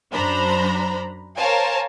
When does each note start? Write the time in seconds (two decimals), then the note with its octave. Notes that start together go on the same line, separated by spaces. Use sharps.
0.12 F#2 F#3 D4 C5 A#5 B5
1.37 A#4 C5 C#5 F5 G#5 A5